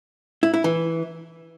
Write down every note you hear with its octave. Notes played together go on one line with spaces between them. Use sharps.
E4
E4
E3